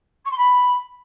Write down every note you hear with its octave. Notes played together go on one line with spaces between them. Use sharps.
C#6
C6
B5